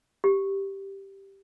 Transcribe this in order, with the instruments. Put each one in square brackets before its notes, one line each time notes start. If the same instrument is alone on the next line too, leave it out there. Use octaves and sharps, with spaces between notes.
[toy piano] G4